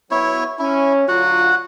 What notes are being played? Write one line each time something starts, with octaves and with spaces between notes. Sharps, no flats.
F#3 B3 E4 C#5
C#4 E4
D3 F#3 F4 F#4 F#5